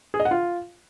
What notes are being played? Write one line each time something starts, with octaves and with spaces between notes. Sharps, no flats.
G#4
D#5
F#5
F4